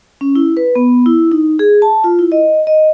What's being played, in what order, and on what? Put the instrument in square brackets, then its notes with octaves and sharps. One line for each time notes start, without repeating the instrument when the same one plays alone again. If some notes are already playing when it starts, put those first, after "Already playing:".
[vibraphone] C#4
E4
B4
B3
E4
D#4
G#4
A5
F4
E4
D#5
D#5